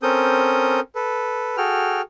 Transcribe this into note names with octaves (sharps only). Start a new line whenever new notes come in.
C4 C#4 A4 A#4 D#6 G6
A4 B4
F#4 G#4 A4 G5 F6